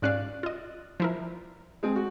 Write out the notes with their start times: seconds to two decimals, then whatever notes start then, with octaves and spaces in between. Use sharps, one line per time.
0.02 G#2 C#4 D5 F5 F#6
0.43 F4 D#5
1.00 F3 E4 A#4
1.83 G#3 C4
1.96 F#4